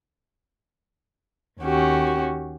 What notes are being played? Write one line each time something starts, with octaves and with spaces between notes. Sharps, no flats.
D#2 C#4 F#4 G4